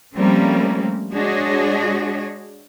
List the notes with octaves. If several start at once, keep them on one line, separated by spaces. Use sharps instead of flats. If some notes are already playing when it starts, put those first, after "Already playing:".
F3 G3 A3 A#3 C4 C#4
G#3 D4 F#4 G#4 C#5 D#5